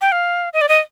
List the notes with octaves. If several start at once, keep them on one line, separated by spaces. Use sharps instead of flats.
G5
F5
D#5
D5
D#5